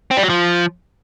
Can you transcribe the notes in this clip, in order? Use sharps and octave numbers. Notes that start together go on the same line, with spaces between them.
C4
G3
F#3
F3